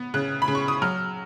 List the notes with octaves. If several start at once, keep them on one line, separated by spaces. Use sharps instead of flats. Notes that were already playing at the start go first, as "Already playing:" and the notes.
Already playing: B3
C#3 F#6
B5
C#3
C#6
D#6
F#3 F6